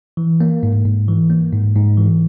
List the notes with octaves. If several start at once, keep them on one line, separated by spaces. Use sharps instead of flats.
E3
A#3
G#2
G#2
E3
A#3
G#2
G#2
E3